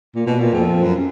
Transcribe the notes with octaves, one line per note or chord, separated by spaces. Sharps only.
A#2
B2
A#2
F2
F#2